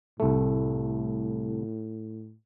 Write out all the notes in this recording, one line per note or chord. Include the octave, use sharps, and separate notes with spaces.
C2 A2 A3